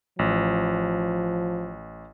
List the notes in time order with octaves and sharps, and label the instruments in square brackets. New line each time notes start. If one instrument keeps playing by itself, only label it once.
[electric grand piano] A1 [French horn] F3